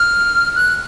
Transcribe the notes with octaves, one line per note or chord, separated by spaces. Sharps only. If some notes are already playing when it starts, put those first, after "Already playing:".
Already playing: F6
F#6